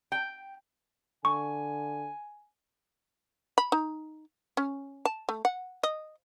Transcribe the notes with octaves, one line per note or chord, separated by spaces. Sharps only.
G5
D3 G#5 C#6
B5
D#4
C#4
A5
A3
F#5
D#5